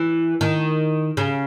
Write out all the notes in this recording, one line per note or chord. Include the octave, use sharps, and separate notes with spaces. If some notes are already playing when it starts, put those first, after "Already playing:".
Already playing: E3
D#3
C#3